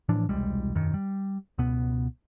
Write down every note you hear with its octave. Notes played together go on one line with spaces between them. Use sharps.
A2 E3 F3 D4
E1 C2 G3 G#3
E1 F#2 D#3
G3
C#2 B2 B3